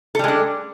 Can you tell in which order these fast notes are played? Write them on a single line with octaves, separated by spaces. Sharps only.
A4 G3 G#3 D4